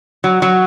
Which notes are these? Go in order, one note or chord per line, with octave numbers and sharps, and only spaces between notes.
F#3
F#3